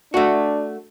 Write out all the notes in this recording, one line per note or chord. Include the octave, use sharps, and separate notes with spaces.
A3 D4 F#4